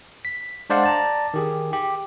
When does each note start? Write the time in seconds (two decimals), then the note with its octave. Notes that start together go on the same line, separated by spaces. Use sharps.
0.25 B6
0.70 G#3 D4 C5 D5 F5 F#5
0.83 D5 A5 A#5
1.34 D#3 G4 G#4
1.73 G4